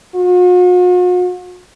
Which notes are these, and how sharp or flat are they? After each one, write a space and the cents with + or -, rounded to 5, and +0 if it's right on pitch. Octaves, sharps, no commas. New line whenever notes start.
F#4 -45